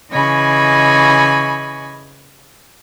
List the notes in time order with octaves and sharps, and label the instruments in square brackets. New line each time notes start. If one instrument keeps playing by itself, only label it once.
[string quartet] C#3 E3 D#5 G#5 B5 C#6